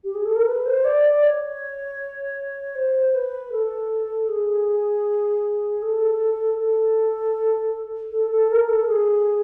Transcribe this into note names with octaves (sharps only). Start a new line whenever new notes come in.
G4
G#4
A4
A#4
B4
C5
D5
D5
C#5
C5
B4
A4
G#4
A4
A4
A4
A4
A#4
A#4
A4
G#4